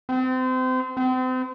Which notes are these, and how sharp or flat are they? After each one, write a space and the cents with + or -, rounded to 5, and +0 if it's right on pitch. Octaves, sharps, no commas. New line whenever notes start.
C4 -30
C4 -35